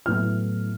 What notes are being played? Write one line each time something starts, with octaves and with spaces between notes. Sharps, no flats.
A2 F#3 B3 E4 F6